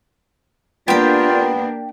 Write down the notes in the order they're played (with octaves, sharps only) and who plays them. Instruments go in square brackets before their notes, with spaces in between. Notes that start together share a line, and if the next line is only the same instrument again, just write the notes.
[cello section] A#3 D4 [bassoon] B3 [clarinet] F4 [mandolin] G4 G5